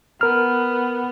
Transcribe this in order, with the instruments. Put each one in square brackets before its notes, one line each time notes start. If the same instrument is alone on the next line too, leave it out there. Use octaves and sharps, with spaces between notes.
[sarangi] B3 [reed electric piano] A#4 F6